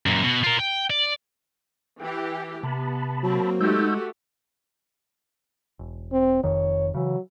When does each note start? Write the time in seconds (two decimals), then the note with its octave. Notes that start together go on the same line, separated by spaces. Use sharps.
0.06 F#2 A#2
0.23 B2
0.43 F4 A#4
0.60 G5
0.90 D5
2.00 E3 G4 G5
2.63 C3 B3 A5 B5
3.23 F#3 A#3 C4
3.61 G#3 A3 D#4 F#4 G4 E6 G6
5.79 E1
6.12 C4
6.44 F1 F2 D#3 C#5
6.94 C#3 E3 F#3